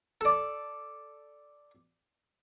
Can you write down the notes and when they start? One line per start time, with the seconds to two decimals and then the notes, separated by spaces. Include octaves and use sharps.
0.21 A4 D5